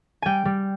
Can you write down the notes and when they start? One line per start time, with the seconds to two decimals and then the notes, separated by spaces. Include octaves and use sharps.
0.22 G3 G5 G#5
0.45 G3